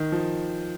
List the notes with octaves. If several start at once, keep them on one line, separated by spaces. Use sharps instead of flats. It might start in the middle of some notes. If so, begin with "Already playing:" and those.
Already playing: D#3
F3